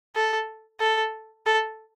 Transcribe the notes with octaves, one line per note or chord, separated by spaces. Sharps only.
A4
A4
A4